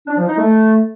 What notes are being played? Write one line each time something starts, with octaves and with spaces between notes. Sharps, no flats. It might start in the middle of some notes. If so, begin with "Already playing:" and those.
D4
F3
D#4
A3